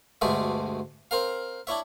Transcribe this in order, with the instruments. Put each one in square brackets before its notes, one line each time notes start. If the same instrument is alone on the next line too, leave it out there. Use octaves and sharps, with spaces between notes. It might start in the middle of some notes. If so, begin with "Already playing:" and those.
[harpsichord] D2 G2 B2 G#3 A3 E5
C4 A#4 F5
D4 E4 C#5 E5